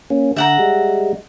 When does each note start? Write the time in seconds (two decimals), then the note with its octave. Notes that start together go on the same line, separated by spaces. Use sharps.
0.10 A#3 C#4
0.36 D3 E5 F#5 A#5
0.59 G3 G#3